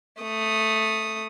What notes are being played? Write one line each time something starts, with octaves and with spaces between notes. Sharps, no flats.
A3 D#6